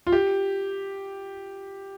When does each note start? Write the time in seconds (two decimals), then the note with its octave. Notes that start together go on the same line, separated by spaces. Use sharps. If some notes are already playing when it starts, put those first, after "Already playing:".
0.07 F4
0.12 G4